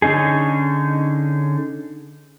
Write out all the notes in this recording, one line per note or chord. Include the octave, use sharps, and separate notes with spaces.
D3 C#4 D#4 G#4